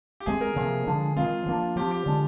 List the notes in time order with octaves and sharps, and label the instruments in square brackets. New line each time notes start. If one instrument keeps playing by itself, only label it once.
[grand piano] G4
[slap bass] D#3 G#3 C4 [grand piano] G#4
[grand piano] A#4
[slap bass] C3 F3 A#3 [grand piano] G#4
[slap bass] D3 F3 G#3 D4
[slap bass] D#3 G#3 C4 [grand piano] F4
[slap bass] F3 A#3 D4
[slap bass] F3 C4 [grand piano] G4
[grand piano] G4
[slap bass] D3 G#3 D4